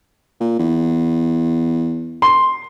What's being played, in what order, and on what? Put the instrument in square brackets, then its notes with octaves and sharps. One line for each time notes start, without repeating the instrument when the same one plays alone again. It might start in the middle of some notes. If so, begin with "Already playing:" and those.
[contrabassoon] A#2
E2
[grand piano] C6